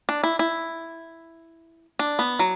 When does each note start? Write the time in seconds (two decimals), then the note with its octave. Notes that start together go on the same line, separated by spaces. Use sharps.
0.09 D4
0.24 E4
0.39 E4
1.99 D4
2.19 B3
2.39 F#3